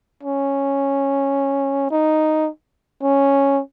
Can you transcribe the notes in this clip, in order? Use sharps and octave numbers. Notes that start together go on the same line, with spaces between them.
C#4
D#4
C#4